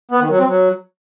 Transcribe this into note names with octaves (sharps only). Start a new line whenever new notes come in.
B3
D#3
F#3
C4
F#3